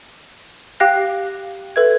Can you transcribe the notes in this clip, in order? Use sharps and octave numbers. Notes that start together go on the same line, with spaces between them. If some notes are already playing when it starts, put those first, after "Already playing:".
G4 F5 G5 F#6 A#6
A4 B4 E5 G#6